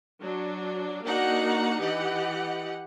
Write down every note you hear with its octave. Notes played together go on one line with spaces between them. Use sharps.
F#3 D4
A#3 D4 D#4 F#4 F#5 A#5
E3 G4 D#5 F#5